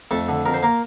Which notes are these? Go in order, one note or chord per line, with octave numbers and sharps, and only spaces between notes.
F2 A3 A4
D3
F2 A#4
C5
A#3 A#4